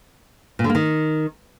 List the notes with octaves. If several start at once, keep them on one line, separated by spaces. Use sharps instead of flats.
A#2
D3
A#3
D#3